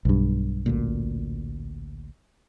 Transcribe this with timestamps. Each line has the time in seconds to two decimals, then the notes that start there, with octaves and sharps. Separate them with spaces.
0.05 B1 G2
0.66 A1 D2 A#2